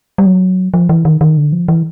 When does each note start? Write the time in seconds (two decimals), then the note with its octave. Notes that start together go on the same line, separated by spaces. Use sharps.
0.18 G3
0.26 F#3
0.74 F3
0.89 E3
1.05 D#3
1.21 D#3
1.37 D3
1.52 F3
1.68 E3